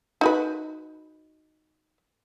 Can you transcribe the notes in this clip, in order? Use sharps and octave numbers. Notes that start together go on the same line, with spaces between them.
D#4 F#4 B4